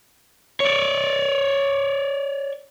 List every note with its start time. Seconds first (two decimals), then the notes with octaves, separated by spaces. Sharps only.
0.60 C#5 D5